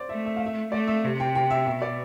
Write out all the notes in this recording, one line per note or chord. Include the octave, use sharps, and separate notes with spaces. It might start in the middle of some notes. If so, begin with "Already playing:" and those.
Already playing: C5 D5
A3 E5
E5
F5
E5
A3 D5
E5
C3
G5
G5
E5
B2 E5
D5